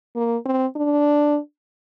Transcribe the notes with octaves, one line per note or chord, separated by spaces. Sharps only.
A#3
C4
D4